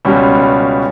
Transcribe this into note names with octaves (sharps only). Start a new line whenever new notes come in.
C#2 B2 G3 C#4